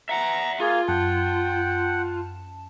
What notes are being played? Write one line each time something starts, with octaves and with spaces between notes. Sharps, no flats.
E5 F#5 A#5
A#3 F4 G#4
F#2 F#5 G5 A5